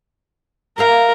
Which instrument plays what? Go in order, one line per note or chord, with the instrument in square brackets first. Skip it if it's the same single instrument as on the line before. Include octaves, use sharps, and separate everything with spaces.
[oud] G4 E5 F5 [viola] A#4